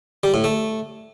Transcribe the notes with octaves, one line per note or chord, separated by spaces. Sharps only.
G3
A2
A3